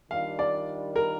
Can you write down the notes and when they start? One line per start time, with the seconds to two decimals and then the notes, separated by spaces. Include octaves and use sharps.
0.11 D#3 G3 D4 F4 F5
0.39 D5
0.96 A#4